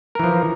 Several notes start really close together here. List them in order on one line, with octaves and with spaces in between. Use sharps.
A#4 E3 F3